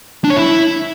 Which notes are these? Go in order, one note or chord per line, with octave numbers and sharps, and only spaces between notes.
D4
C#5
E4